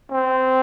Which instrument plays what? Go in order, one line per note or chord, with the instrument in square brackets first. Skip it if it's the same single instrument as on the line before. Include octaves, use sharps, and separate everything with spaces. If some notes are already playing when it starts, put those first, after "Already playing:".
[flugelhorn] C4